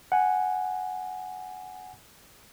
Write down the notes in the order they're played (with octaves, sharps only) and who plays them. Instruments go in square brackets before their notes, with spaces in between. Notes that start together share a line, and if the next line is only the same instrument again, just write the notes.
[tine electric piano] F#5 G#5